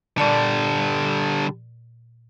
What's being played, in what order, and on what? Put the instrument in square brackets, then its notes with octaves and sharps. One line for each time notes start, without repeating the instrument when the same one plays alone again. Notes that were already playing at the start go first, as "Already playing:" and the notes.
[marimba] A#2 D5 A5 [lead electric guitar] D3 G3